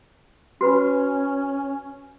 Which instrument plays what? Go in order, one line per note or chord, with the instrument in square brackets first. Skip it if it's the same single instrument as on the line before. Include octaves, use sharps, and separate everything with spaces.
[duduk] C#4 [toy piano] F#4 B4 B5